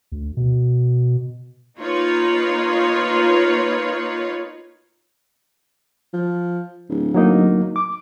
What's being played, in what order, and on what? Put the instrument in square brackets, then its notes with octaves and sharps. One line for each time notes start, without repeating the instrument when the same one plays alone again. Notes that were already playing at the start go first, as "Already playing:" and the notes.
[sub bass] D2
B2
[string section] A#3 D#4 F4 B4 C#5
[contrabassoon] F3
D1
[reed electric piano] F#3 A#3 D#4
D6